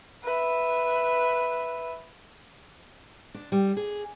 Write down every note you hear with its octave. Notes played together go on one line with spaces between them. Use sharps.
B4 E5
D4
G3
G#4